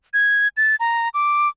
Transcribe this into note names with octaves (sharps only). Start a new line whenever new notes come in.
G#6
A6
A#5
D6